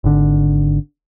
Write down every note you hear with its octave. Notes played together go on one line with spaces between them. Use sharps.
G#1 D3